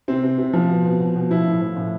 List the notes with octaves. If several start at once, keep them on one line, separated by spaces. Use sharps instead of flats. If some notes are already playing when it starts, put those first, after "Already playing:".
C3 C4
C3
C3
F3
B2
B2
B2
B2
F3 E4
A2
F3
A2